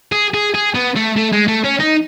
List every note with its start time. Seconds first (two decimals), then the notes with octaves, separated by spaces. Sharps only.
0.12 G#4
0.34 G#4
0.54 G#4
0.75 B3
0.96 A3
1.17 A3
1.33 G#3
1.48 A3
1.64 C#4
1.80 D#4